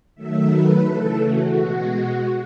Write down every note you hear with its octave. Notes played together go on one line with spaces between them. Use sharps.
D#3 F#3 A3 E5
B4
C#3 E3 A3 A4
F#4
B2 G#3